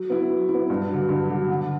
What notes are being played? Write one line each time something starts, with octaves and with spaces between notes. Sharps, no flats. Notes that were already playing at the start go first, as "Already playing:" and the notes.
Already playing: F#3
B3 E4
F#3
E4
B3
G2
D3 F#3
G2
D3 F#3
D3